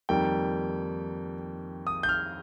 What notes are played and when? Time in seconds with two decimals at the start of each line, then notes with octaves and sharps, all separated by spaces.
0.09 F2 D#3 G3 A#3 G5
1.87 D#6
2.03 G6
2.09 F6